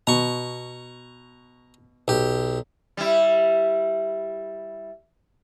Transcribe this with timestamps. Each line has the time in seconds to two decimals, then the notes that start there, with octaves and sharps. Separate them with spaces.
0.07 B2 A#5 C#6
2.08 B1 G4
2.97 G3 E4